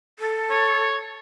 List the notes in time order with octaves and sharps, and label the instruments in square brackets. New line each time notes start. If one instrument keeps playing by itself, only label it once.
[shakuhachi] A4
[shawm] C#5